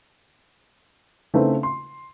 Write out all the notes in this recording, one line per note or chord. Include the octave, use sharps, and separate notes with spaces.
C#3 A3 C4 D#4 E4 B4
C6